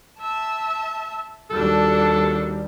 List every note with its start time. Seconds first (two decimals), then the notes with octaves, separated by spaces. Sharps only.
0.19 E5 A5
1.51 D#2 G3 D4 F#4 A4